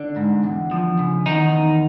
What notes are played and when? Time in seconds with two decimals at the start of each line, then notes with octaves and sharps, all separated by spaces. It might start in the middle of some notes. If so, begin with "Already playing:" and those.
Already playing: D3 D4
0.16 G#2
0.44 E2
0.71 F3
0.99 C#3
1.26 E2 D#3 D#4
1.53 E2